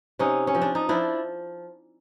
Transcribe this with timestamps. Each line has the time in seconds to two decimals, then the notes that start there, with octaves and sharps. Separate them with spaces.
0.19 C3 C#4 D#4
0.47 C#4
0.55 F3
0.62 D4
0.75 D#4
0.89 F3 D4 E4